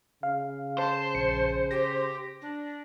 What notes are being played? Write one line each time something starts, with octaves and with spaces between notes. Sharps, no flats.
C#3 F5
C5 A5
A#1 C#7
G4 A#6
D4